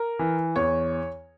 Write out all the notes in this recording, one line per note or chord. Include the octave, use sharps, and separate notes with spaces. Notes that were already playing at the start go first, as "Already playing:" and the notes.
Already playing: A#4
E3
E2 C#5